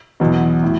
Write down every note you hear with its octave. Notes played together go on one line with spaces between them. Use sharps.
E2 B2 F#3
A2